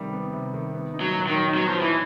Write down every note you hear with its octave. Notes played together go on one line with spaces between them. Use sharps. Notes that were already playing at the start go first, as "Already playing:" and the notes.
Already playing: C3 D#3 G3 B3
B3
C3
D#3
B3
D#4
F#3
A#2
D#3
F#3
F#3 B3
F3
D#4
E3